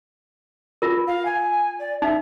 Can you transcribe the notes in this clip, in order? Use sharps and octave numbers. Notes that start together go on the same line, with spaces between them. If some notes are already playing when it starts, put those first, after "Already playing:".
F4 A#4
F5
G#5
D5
D#4 E5